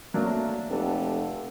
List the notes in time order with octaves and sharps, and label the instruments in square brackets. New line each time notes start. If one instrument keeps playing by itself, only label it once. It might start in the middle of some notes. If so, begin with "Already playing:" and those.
[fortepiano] F#3 A#3 D4 [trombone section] A3
[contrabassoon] F1 [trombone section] F#4 G4 A4